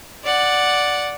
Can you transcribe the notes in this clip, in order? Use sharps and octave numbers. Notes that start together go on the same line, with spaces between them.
D5 F#5